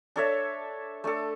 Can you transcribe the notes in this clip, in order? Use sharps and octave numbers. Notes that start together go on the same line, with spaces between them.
D4 A4 C#5 E5
A3 D4 A4